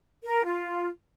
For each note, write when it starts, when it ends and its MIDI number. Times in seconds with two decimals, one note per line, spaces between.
0.24 0.43 70
0.44 0.88 65